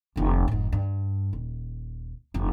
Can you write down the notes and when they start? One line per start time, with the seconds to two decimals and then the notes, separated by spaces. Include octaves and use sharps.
0.16 F1 D#2
0.48 F1 G#2
0.72 G2
1.33 D#1
2.34 F1 G2